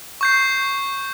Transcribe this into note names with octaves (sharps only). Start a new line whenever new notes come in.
C#6 G6 C7